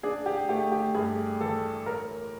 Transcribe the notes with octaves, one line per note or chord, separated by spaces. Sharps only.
D4 G#4
G4
A3 G4
G4
G2 G#4
E3 A4
A2 A#4